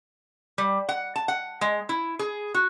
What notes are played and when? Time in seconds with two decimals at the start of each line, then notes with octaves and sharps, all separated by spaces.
0.58 G3
0.89 F#5
1.16 A5
1.28 F#5
1.61 G#3
1.89 E4
2.19 G#4
2.54 F#4